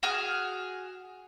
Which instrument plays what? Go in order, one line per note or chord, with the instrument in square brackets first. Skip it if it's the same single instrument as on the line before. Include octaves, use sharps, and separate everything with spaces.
[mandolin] F#4 G#4 F6